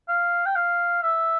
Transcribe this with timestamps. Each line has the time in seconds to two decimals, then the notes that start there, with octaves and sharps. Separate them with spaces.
0.08 F5
0.46 G5
0.56 F5
1.03 E5